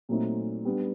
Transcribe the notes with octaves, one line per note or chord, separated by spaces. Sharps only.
A#2 F#3 A3 C4 D#4
G3 B3 D4